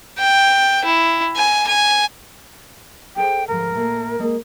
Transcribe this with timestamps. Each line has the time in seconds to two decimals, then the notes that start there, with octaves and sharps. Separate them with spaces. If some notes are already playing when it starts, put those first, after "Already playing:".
0.18 G5
0.84 E4
1.36 G#5
1.67 G#5
3.16 G#4 A4 C5 G5
3.48 D2 G#2 F3 A#4
3.74 A#2 A3 A#3
4.19 G#3 A#3 D#5